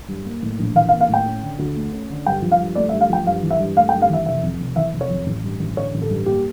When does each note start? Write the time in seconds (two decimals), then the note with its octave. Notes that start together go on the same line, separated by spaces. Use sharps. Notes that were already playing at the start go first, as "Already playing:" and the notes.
0.08 G2
0.26 A#3
0.43 A2
0.59 A#1
0.75 E3 F5
0.89 F5
0.92 A#3
1.01 F5
1.09 A2 G5
1.26 C#4
1.42 D3
1.59 D2
1.76 A3
1.92 C#4
2.10 D3
2.26 G2 G5
2.42 F3
2.51 F5
2.60 G2
2.75 A3 D5
2.89 E5
2.93 G2
3.01 F5
3.09 F3 G5
3.27 G2 F5
3.43 E3
3.51 E5
3.59 G2
3.77 A3 F5
3.89 G5
3.93 G2
4.02 F5
4.10 E3 E5
4.26 F1 E5
4.43 F2
4.60 F1
4.76 E3 E5
4.93 F1
5.01 C#5
5.10 F2
5.26 A1
5.44 G2
5.59 A1
5.76 D3 C#5
5.94 A1
6.01 A4
6.10 G2
6.26 A#3 G4